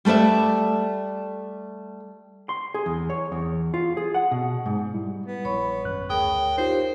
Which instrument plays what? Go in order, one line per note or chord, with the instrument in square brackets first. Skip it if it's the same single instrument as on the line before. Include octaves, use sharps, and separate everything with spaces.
[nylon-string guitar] G3 A3 B4 D5 E5
[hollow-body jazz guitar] C6
G#4
E2
C#5
E2
F4
G#4
F#5
B2
G#2
[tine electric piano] G3 E4
[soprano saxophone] B3
[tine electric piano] A#1 [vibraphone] C#5 B5 C#6
[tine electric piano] G#1 F#2 F#6
[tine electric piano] D2 D#6 [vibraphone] G#4 A#4 C#5 [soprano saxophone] G5
[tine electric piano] D#4 F4 G4 [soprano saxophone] C5